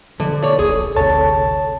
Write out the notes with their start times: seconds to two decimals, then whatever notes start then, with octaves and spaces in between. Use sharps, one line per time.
0.20 D3 F3 A4
0.43 C#5 D5
0.59 D#1 A#1 G#4
0.96 G#1 D2 C3 C#5 A5